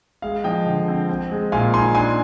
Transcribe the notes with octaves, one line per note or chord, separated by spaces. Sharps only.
G#3 F5
F3 D#5 G5
D3
C4
C4
G#3
A#2 F5 G#5
D#4 G#5 C6
D4 G#5 C6